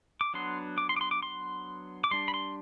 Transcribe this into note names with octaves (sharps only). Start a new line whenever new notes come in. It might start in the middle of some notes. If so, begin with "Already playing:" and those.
D6
F#3 B3 D4 C6
D6
C6
D6
C6
D6
C6
D6
G3 D4 C6
B5
C6